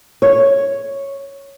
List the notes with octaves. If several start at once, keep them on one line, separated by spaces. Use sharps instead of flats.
C#5